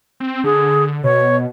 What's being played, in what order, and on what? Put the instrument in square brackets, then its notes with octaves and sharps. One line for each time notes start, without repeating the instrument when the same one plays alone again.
[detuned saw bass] C4
[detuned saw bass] D3 [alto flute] G#4
[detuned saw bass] B2 [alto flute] C#5